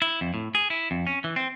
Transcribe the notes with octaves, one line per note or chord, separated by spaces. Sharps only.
E4
F2
A2
G#4
E4
F2
C#4
E3
C4